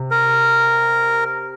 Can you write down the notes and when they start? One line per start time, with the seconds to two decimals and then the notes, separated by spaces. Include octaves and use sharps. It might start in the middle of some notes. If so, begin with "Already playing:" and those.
Already playing: C3
0.11 A#4